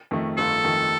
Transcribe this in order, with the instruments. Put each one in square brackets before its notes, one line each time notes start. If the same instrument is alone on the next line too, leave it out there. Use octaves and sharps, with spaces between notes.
[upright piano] F2 D#3 A3
[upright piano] G1 [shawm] A4
[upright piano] F2 D#3 A3